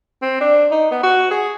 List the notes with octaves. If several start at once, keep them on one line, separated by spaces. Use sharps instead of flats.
C4
D4
D#4
B3
F#4
G#4